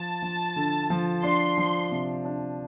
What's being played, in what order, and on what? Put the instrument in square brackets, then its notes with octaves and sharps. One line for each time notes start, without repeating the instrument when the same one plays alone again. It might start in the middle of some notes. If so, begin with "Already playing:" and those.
Already playing: [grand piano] F3 [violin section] A5
[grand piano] F3
D3
F3
[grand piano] D4 [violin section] C6
[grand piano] F3
C3
D4